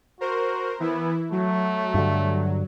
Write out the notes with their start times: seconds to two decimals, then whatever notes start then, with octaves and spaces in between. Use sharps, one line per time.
0.21 F#4 A#4 C5
0.80 E3 B3 E4
1.32 F#3 A3
1.94 G2 D3